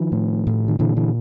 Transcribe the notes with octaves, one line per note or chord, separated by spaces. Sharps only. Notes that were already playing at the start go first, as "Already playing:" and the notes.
Already playing: D#3 F3
A2
A2
D#3
A#2 D3 E3
D3 E3